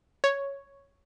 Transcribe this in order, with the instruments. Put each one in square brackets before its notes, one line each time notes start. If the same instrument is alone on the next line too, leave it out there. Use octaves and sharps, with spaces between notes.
[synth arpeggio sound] C#5